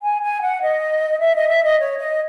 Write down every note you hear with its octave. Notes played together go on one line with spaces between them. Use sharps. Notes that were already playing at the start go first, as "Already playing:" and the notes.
G#5
G#5
F#5
D#5
E5
D#5
E5
D#5
C#5
D#5